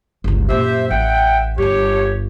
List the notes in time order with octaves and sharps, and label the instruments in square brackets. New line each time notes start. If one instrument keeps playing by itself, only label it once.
[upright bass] G1 C#2
[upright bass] F#2 A#2 [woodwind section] G4 C5 E5
[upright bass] A1 [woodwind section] E5 F#5 G5
[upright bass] G1 G2 [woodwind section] G4 C#5